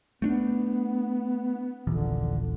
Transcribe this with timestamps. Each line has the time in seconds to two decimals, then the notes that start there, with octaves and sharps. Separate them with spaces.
0.22 A3 B3 C4 D4
1.87 D#1 A#1 D3 E3